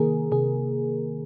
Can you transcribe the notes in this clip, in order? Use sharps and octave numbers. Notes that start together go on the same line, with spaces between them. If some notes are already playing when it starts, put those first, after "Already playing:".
Already playing: C3 D#3 A#3 G#4 A#4
C3 G#4